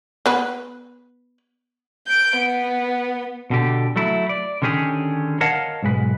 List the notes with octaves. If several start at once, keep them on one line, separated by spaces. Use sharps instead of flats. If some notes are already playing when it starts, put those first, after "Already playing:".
B3 B4
G6 D7
B3
B2 D3 G4
F#3 A3 E4
D5
D3 D#3 C#4 G4 G#4
A#4 C#5 D#5 F5 F#5 A5
B1 G#2 G#3 B4